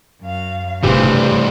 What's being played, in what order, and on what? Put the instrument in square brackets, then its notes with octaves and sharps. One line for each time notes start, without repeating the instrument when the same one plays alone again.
[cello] F#2 F5
[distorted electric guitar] G2 E3 [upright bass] C3 A3 [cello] C4 [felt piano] G4